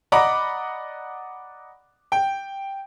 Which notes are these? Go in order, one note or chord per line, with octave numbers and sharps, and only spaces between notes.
D5 D#5 F#5 A#5 B5 D6
G5